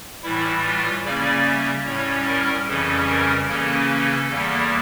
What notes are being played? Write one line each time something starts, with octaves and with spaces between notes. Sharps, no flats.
A2 E3 G3 E4
F4
C#3 G3 A#3 C#4 D5
E5
A2 G3 C#4 C#5
A#4
F2 C#3 E3 G3 C#4 A4
A#4
C#3 E3 A#3 C#4 A4
A4
E2 E3 G3 A#3